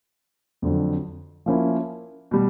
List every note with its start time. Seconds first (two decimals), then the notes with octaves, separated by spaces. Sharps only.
0.62 F2 D3 F#3
1.46 F3 A#3 C#4 E4
2.31 B2 G3